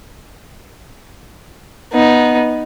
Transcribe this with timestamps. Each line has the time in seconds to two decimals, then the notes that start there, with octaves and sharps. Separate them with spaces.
1.92 B3 D#4